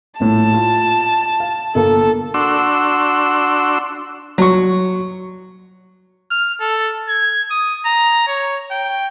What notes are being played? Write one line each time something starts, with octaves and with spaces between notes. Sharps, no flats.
A#1 A2 A5
F4
F5
G1 A#3 A4
D4 F#4 C6 E6
F#3 C#6
F6
A4
G#6
D#6
A#5
C#5
G5